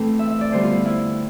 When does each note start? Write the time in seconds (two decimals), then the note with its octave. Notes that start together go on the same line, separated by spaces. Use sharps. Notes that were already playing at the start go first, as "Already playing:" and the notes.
Already playing: E3 A3 C4 A4
0.19 E5
0.30 E5
0.41 D5
0.52 D3 G3 B3 C5
0.63 F4
0.75 E4
0.86 E4